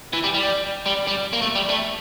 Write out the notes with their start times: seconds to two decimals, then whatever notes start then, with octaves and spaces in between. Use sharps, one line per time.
0.13 E3
0.23 G3
0.34 G3
0.86 G3
1.07 G3
1.33 A#3
1.42 A3
1.56 G3
1.69 A3